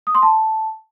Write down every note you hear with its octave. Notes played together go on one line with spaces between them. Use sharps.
D#6
C6
A5